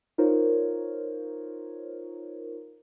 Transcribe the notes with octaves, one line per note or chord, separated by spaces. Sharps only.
D#4 F4 A#4 C5 C#5